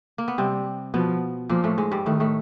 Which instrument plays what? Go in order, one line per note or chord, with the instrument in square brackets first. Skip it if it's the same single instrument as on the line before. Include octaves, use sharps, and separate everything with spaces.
[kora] A#3
B3
[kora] C3 C4 [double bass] G3
[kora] B2 B3 [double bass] F3
[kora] A#2 A#3 [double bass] F3
[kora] A2 A3
G#2 G#3
G2 G3
[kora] A2 A3 [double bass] D#3
[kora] A2 A3